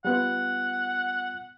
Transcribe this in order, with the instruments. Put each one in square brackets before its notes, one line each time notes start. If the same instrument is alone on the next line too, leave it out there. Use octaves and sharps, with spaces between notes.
[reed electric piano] G3 B3 F4 [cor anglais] F#5